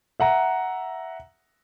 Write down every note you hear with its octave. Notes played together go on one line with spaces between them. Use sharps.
E5 F#5 A#5